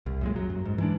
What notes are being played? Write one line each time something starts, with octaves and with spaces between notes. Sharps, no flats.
C2
F#2 A#2 G#3
F#3
F#2
G#2
E3 G#3 D4